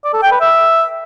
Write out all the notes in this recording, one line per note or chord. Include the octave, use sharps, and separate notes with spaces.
D5
A4
G5
B4
E5